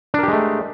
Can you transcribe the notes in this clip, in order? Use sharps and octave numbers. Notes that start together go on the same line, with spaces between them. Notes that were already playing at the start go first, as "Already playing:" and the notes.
G#3 A3 D4 G4 A#4